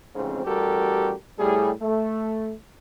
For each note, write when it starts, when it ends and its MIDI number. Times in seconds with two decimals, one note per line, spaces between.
0.15 0.44 33
0.15 0.44 41
0.15 0.44 44
0.15 0.44 49
0.15 0.44 60
0.45 1.13 33
0.45 1.13 55
0.45 1.13 66
0.45 1.13 67
0.45 1.13 69
0.45 1.13 70
1.38 1.71 45
1.38 1.71 55
1.38 1.71 68
1.82 2.53 57